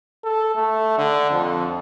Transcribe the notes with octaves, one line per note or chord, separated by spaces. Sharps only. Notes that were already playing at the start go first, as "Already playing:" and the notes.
A4
A3
D3
F2